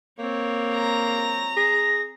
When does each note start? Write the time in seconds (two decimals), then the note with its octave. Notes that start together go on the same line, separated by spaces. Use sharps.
0.19 A#3 C4 C#5
0.75 A#5
1.56 G#4 A#6